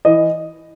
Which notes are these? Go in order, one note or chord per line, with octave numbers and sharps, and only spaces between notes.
E3 D#5